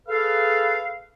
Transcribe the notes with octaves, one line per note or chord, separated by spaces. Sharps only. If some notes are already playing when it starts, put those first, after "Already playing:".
G#4 A4 B4 F5